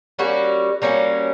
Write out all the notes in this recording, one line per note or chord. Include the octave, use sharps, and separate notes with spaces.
G3 A#3 C#4 F#4
G3 A#3 C#4 F#4